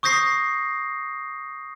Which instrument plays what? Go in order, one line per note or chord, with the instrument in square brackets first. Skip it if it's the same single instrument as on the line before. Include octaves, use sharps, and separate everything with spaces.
[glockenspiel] C#6 D#6 G6 A#6 C7